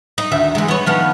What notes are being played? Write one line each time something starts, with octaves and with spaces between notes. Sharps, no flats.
D#4
D2 D#3 E5
E3 G#3
B3 C#5
D#3 F3 B3